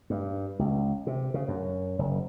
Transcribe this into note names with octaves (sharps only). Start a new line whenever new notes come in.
G2
C#2
C3
C#3
F#2
F#1